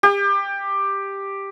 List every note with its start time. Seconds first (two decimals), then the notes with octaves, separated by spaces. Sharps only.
0.03 G4